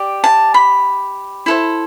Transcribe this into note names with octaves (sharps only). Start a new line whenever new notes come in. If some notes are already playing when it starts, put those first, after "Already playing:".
Already playing: G4 D5
A5
B5
E4 A4 C5